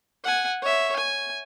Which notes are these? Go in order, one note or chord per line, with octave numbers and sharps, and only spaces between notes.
F#5 G#5
C#5 E5
G#5